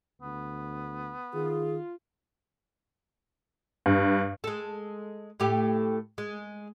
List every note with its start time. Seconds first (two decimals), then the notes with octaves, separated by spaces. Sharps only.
0.22 D2 B3
1.34 D#3 F4 G#4
3.86 G2
4.44 G#3 A4
5.40 A2 A3 G4
6.18 G#3